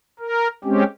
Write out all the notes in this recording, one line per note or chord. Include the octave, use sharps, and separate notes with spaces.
A#4
G#3 C4 C#4 G4